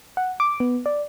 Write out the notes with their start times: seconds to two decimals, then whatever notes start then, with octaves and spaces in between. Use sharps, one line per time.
0.17 F#5
0.40 D6
0.60 B3
0.86 D5